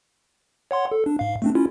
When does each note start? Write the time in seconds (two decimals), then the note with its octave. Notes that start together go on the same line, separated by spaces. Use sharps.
0.71 C#5 F#5 C6
0.92 A4
1.06 D4
1.19 G#2 F5
1.42 A3 C4 D4
1.55 C#4 E4 F4